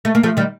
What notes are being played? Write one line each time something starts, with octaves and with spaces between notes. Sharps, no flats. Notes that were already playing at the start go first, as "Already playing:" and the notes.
A3
A#3
F3 A3
D#3 G3